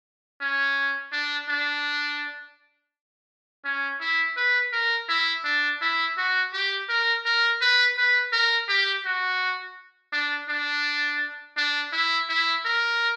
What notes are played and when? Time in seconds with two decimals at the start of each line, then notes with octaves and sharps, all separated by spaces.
0.41 C#4
1.12 D4
1.49 D4
3.65 C#4
4.00 E4
4.37 B4
4.72 A#4
5.08 E4
5.44 D4
5.81 E4
6.17 F#4
6.53 G4
6.89 A#4
7.25 A#4
7.61 B4
7.97 B4
8.32 A#4
8.68 G4
9.05 F#4
10.12 D4
10.49 D4
11.57 D4
11.92 E4
12.29 E4
12.65 A#4